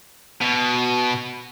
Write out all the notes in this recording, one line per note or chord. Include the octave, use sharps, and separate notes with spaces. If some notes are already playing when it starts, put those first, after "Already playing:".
B2